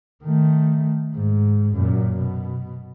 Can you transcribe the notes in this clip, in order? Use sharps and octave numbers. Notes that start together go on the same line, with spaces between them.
D#3 A3
G#2
F#2 A#2
B2